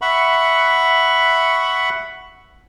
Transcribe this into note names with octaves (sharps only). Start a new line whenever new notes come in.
E5 F#5 B5 C#6